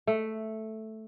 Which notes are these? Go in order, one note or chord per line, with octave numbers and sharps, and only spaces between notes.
A3